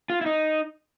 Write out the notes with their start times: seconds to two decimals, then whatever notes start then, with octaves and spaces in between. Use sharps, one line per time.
0.10 F4
0.21 E4
0.26 D#4